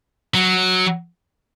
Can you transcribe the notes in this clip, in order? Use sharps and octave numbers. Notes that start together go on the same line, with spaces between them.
F#3